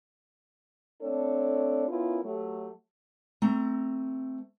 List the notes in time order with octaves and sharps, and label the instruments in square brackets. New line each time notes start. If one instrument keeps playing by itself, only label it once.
[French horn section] A3 C4 D4 A4 C#5
B3 C#4 E4 F4 A#4
F#3 A3 G4
[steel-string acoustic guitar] A3 C4 A#5